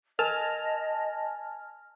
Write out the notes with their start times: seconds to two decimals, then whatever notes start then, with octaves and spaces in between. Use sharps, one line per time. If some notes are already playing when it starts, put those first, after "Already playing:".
0.19 A#4 D#5 G#5 A5 F6